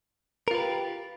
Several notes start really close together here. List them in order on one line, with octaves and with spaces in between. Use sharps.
A#4 F4 B4 G4